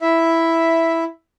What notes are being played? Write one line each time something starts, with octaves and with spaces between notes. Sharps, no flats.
E4 E5